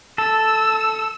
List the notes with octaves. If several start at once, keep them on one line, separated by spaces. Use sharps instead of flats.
A4 E6